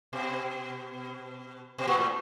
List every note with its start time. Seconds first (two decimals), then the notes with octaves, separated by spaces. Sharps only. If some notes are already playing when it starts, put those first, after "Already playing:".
0.13 B2
1.78 B2
1.87 A#2
1.97 A2